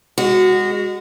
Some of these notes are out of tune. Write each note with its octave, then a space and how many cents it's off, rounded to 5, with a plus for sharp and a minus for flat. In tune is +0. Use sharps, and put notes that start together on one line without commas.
G#3 -30 F#4 +0